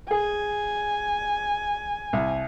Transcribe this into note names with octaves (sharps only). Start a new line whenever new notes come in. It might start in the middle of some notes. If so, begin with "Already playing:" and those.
G#4 G#5
C2